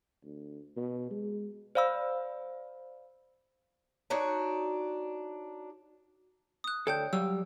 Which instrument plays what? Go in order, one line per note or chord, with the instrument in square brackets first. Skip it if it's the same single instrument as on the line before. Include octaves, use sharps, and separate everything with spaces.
[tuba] D2
B2
G#3
[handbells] C5 D5 F5 B5 E6
[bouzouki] D4 D#4 F#4 C#5
[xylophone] D#6 F#6
[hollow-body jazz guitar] D2 A4 [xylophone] C#5 G5 G6
[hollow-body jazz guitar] F#3 G3 F5 [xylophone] E6